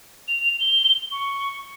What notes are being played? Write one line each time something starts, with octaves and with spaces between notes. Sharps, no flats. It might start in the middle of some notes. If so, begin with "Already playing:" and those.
F7
G7
C#6